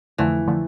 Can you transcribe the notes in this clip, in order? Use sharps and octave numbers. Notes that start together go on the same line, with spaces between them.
F2 D3 E3 F3 A3
D3 F3 A3